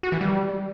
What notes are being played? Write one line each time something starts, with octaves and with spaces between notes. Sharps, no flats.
F#4
E3
G3